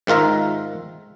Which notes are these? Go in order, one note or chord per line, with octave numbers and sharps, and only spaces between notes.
G#2 D#3 F4 A#4 E5